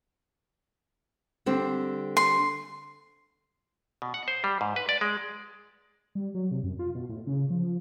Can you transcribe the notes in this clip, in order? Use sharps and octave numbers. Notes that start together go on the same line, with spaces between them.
D3 G3 C4
C6
B2
F#5
C5
G3
G#2
B4
D5
G#3
G3
F#3
C3
F#2
F4
B2
A2
C#3
F3